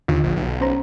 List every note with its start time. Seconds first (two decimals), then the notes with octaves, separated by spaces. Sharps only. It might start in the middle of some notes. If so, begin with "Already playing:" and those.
0.08 D#2 D3 F4
0.23 A#1
0.36 B1
0.61 C#4 C5 A#5